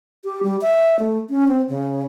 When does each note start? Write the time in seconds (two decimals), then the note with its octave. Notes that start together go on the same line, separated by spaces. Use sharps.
0.24 G4
0.43 G3
0.61 E5
0.99 A3
1.30 C#4
1.48 C4
1.69 C#3